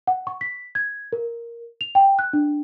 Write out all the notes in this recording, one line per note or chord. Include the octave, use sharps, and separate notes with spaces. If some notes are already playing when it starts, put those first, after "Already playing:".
F#5
C#6
B6
G#6
A#4
F7
G5
F#6
D4